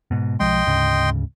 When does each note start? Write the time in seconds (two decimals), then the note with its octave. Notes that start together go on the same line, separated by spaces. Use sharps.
0.11 G#2 B2
0.40 B1 F3 G#3 D#5 G5 C6
0.66 D2 G#2 C#3